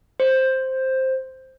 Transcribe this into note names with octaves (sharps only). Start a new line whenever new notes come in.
C5